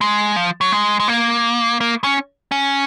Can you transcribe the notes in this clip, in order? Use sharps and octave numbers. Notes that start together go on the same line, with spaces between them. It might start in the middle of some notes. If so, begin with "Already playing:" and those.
G#3
F3
F#3
G#3
G#3
A#3
A#3
C#4
C#4